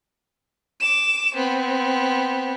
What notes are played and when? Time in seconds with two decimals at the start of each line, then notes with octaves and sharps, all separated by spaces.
0.80 D6 E7
1.35 B3 C4